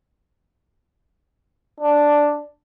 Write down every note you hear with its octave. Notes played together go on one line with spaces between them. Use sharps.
D4